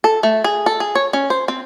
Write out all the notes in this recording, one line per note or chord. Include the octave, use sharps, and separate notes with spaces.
A4
A3
G#4
A4
G#4
C#5
C#4
C5
C4